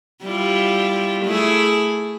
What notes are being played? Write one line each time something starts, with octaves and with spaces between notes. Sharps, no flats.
G3 E4 F4
A3 E4 G#4